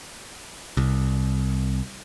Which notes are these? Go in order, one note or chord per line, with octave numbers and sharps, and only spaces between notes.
C2